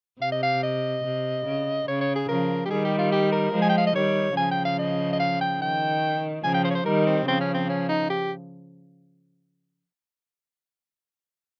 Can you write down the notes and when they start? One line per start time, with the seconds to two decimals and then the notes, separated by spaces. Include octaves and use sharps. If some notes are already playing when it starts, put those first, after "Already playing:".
0.21 C3 F5
0.32 D#5
0.43 F5
0.63 D#5
1.04 C3
1.46 C#3
1.87 C#3 C#5
2.01 C#5
2.16 G#4
2.28 C#3 F3 A#4
2.65 G4
2.70 D#3 G3 G#4
2.85 G4
2.99 F4
3.12 G4
3.32 A#4
3.53 F3 G#3
3.62 G#5
3.69 G5
3.78 F5
3.87 D#5
3.95 D#3 G3 C#5
4.36 C#3 F3 G#5
4.51 G5
4.65 F5
4.79 D#5
5.13 D#5
5.20 F5
5.41 G5
5.61 D#3 G5
6.44 C#3 F3 G#5
6.54 G5
6.65 C5
6.71 C#5
6.75 C5
6.85 D#3 G3 A#4
7.07 C4
7.28 C#3 F3 C4
7.41 C#4
7.54 C4
7.69 C#4
7.89 D#4
8.10 G4